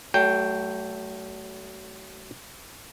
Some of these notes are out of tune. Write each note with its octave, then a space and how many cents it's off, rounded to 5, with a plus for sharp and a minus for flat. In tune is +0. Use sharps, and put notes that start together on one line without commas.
F#3 +40 A3 +0 G5 +0